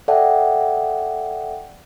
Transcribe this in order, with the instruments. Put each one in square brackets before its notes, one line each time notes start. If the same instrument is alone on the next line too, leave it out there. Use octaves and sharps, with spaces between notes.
[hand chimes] A4 D5 E5 F#5 G5 A5